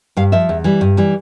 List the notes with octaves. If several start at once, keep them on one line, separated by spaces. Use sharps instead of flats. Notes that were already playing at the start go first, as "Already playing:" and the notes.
G2 F5
F3 E5
E2
E3 G3
G2
E3 G3